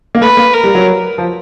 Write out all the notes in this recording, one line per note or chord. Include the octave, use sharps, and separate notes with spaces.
A#3
A3 B4
A#3
A#4
G3
F#3
F3